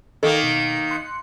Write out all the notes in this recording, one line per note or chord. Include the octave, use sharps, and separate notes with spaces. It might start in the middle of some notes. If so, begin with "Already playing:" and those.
D#3 A#3 A4 D6
B2
C6 F#6 C#7